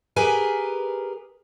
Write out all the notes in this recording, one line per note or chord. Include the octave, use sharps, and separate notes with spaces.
G4 G#4 A#4 B4 G#5